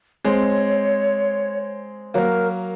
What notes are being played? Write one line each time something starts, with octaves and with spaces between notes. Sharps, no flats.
G#3 C4 C#5
F#3 A#3 A#4 C#5